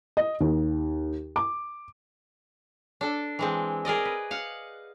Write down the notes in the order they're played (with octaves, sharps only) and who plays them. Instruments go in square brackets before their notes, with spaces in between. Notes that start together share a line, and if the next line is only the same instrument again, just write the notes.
[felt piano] D#5
D#2
D6
[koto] D4 A4
E3 G#3 C4
G#4 A#4 D5 D#5
B4
F5 F#5